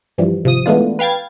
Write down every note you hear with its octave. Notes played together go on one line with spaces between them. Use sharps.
G2 E3 F3 G3
G#1 C3 F3 D#6
E3 G#3 A3 B3 D4 F4
B4 F5 G5 G#6 A6